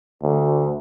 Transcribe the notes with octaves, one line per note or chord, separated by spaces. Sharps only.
D2